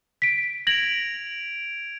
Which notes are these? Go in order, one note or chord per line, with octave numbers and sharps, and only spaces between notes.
B6 D7
G#6 A#6 D7 F7 F#7